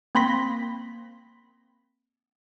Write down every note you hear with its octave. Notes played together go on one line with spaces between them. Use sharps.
A#3 C4 B5 C6 A#6 B6